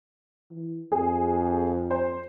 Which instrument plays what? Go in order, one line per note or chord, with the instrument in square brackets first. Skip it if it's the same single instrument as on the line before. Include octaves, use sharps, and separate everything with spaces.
[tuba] E3
[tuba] F2 [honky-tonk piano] G#4
[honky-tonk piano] C5